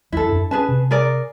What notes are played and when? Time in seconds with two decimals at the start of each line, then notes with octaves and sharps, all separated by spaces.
0.12 D#2 F#3 E4 A4
0.29 F#2 D4
0.51 C#4 G#4 B4 A5
0.68 C3
0.91 G#4 A#4 D5